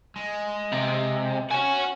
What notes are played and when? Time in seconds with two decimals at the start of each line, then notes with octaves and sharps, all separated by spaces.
0.16 G#3
0.72 C3
1.51 F#4 C#5 G#5